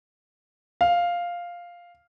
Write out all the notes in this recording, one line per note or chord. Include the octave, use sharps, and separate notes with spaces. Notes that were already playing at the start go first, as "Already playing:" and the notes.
F5